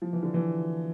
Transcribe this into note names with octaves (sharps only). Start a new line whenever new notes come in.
F3
E3
D3
E3